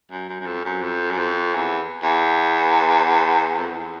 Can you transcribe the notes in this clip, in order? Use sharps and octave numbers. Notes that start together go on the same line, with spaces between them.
F#2
F#2
F#2
F2
F#2
F2
F#2
F2
E2
E2
F2
E2